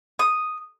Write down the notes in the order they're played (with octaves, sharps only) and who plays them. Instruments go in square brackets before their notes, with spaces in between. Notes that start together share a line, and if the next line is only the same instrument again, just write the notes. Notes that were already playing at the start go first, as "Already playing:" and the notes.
[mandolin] D#6